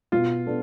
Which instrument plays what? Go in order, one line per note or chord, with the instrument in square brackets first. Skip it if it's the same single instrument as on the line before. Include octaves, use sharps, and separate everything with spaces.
[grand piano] B2 [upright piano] F4
[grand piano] B3 D4 A4